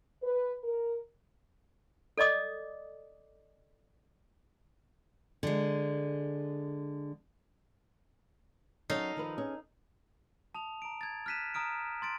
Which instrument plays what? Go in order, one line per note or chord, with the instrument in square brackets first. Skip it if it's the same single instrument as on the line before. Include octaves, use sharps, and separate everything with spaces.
[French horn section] B4
A#4
[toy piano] A4 D5 D#5 D6 D#6
[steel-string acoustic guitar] D3 G#3
[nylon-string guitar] F#3 C#4 C#5 [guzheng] D#4 A4 F5
[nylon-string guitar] D#3 F3 B4
C#4 G#4
[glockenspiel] A5 D#6 F7
A#5 D7
G#6 A6
F6 F#6 B6 D#7 E7
A#5 D#6 F6 D7
C6 A6 D7